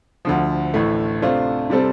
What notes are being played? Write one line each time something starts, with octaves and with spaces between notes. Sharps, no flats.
D2 D3 F3
A1 A2 A3
C3 A3 D4 F4 C5
C3 G3 C4 A4 C5